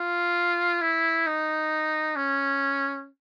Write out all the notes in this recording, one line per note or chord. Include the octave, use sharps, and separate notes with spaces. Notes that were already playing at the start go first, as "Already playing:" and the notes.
Already playing: F4
E4
D#4
C#4